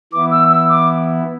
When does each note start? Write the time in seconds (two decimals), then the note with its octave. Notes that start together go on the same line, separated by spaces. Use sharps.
0.13 E3 B3 E4 D6
0.31 E6
0.50 E6
0.69 D6